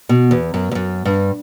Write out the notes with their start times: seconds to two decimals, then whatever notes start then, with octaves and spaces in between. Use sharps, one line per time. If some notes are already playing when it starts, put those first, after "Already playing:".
0.09 B2
0.31 E2
0.54 F#2
0.71 E2
0.75 F#2
1.05 G2